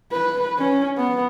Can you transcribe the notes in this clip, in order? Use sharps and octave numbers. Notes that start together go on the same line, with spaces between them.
B4
C#4
B3